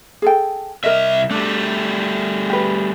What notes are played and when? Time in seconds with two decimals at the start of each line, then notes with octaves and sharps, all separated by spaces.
0.22 G#4 A4 G5
0.84 C2 A#4 D#5 E5
1.31 G3 A3 D4
2.50 G4 B4